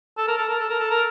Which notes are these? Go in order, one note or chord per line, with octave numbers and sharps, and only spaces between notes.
A4
A#4
A4
A#4
A4
A#4
A4
A#4